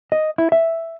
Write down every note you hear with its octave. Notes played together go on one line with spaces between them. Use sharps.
D#5
E4
E5